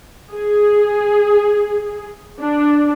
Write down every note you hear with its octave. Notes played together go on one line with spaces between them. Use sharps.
G#4
D4